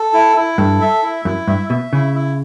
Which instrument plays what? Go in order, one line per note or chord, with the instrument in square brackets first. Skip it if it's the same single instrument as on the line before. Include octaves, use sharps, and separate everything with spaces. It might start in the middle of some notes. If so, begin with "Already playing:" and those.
Already playing: [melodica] A4
E4
E4
[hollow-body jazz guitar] G2 [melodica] A4
[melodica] E5
E4
[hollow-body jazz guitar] F#2 [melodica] E4
[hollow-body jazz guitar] G2 [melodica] E5
[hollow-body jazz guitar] B2 [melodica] E5
[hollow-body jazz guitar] C#3 [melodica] E4
[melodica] E4